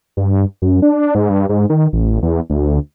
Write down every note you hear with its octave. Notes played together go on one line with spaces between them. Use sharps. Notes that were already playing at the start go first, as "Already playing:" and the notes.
G2
F#2
D4
G#2
G2
G#2
D#3
A1
E2
D2